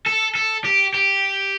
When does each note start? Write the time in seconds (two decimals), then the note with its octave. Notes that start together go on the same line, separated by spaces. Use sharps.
0.06 A4
0.35 A4
0.65 G4
0.94 G4